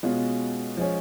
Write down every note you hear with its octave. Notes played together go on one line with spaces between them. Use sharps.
B2 G#3 C#4 F4
F3 G#3 C#4